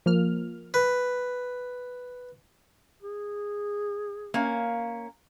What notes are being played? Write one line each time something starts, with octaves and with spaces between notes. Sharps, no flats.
F3 A#3 F6
B4
G#4
A#3 C#4 F5